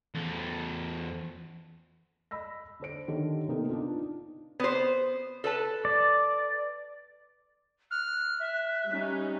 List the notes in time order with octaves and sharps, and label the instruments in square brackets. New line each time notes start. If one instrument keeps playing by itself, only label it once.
[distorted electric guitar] E2 A4
[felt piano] D#5 B5 E6 A#6
D3 D4 C5 D7
D3 D#3 G4 C#5
C3 A#3 B3 D#4 A4
D4 D#4 F4
[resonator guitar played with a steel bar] B3 C5
A4 B4 A5
[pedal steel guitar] D5
[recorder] F6 [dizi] F#6
[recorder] E5
[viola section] G3 C#4 D#4